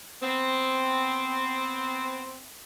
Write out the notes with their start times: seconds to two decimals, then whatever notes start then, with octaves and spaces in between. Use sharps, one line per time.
0.22 B3 C4